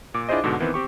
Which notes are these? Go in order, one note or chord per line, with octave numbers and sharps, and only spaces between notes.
A#2 D6
D4 E4 F4 G#4 C5 D#5
G#2 B2 D3 F#4
D#3 E3 B3 C4
C4 G4 C#6